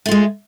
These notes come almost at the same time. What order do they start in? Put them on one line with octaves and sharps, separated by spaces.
A3 F4 G#3